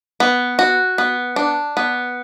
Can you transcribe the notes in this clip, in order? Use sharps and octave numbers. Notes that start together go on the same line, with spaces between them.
B3
F#4
B3
D4
B3